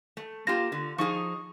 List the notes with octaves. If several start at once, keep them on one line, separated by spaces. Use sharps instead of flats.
A3
A#3 F4 G4 A#6 E7
D3
F3 D#4 G#4 C#6